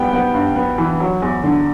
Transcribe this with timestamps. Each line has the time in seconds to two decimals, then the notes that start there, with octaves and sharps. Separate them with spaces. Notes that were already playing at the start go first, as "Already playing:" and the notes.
Already playing: G3 B3 G5
0.13 B3
0.34 G2
0.56 B3
0.78 E3
1.00 F#3
1.22 E2
1.43 D3